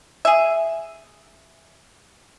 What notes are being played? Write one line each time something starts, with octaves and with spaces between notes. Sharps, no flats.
G#4 E5